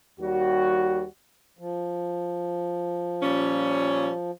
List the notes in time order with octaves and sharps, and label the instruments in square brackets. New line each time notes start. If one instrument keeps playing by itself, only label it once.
[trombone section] D#2 G3 F#4
[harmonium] F3
[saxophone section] A#2 G3 C#4